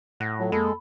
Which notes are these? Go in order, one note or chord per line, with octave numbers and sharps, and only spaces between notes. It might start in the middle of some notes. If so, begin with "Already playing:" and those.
A2 F#5 F#6 A#6
F#3 F4 A4 F#5
F2 G#3 A#3 A4 B5